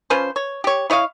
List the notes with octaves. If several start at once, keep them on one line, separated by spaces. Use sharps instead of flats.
F3 C#4 B4 C5
C#5
G4 C#5
E4 C#5 D#5 F5